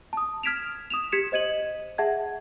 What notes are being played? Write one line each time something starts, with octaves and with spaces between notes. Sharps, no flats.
A5 D#6
F6 G#6 B6 D7 E7 F7
D#6 E7 F7
G4 G#6 B6 C#7 E7
C5 D#5 G#6 D#7 F#7
G#4 E5 F#5 A5 G#6